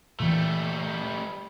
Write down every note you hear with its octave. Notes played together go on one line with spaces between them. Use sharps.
A#2 E3 G3 A3